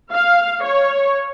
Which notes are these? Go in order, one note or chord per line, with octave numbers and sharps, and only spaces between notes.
F5
C#5